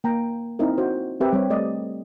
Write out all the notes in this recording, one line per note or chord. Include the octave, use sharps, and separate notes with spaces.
A#3 G5 A#5
C4 D#4 E4 A#4
F#4 C5
C4 G4 A#4 B4 E5 G5
G3 C4 C#5
A3 D5 D#5